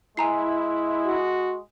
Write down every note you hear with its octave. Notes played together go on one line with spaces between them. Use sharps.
G#3 E4 G#5 A#5 C7
F#4